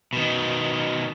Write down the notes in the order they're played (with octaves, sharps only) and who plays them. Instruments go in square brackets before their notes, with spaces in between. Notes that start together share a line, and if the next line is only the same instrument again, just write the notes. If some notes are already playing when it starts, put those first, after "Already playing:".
[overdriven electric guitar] B2 D#3